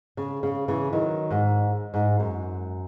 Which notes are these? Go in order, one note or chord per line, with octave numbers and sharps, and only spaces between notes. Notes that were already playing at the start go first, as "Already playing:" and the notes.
C#3
C#3
C#3 E3
D#3 F#3
G#2
G#2
F#2